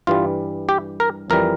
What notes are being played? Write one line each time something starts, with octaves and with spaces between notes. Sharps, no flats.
G2 E3 G3 F4
G4
A#4
F2 E3 G3 A#4